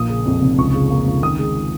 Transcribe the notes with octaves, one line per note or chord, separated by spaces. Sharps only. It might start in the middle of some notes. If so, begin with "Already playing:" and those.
Already playing: A#1 A#3 D#6
C#3
F2
F1
C#2 C#6
C#3
A#3
C#2
D#3 D#6
G#3